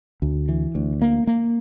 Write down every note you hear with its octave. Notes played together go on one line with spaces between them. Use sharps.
D2
E3
D2
A#3
A#3